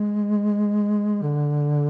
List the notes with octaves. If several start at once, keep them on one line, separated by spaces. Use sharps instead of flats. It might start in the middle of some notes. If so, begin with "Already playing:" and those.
Already playing: G#3
D3